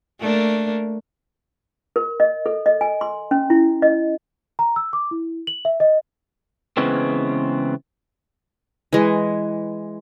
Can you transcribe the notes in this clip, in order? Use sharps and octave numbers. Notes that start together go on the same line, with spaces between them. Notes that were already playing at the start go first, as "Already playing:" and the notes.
A3 A#3 D4
A#4
D#5
A4
D#5
G#5
C6
C#4
E4
D#5
A#5
E6
D6
E4
F#7
E5
D#5
C#3 E3 G#3 B3 C4
E3 G#3